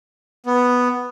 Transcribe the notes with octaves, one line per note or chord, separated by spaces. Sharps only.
B3